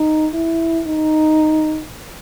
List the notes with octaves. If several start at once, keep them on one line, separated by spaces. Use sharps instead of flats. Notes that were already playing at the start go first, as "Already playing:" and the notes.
Already playing: D#4
E4
D#4